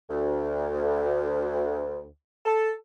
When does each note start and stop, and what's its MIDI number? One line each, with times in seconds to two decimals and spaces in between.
0.09 2.05 38
2.46 2.72 69